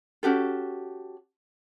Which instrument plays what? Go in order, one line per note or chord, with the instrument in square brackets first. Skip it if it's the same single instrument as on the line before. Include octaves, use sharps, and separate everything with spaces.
[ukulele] C#4 F#4 G4 A4